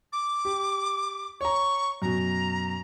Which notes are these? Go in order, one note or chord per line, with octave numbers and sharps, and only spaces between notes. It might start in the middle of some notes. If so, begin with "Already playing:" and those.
D6
G4
C#5 A#5 C#6
F#2 B2 A#5